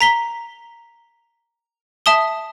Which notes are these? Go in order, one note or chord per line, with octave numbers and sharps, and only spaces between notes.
A#5 B6 G7
E5 A5 D#6 G7